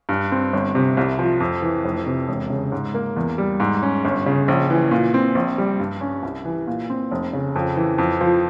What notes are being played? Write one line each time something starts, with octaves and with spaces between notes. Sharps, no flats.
G2
C4
G1
C3
C2
F3
F2
E3
F1
C3
E1
C#3
G#2
A#3
E2
G3
G#2
C#4
G1
C#3
A#1
E3
A#2
C4
A#1
G3
G2
C#4
C2
E3
A#2
C4
F1
C#3
F2
E3
F2
F3